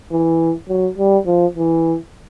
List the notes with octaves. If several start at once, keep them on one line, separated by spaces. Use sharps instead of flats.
E3
F#3
G3
F3
E3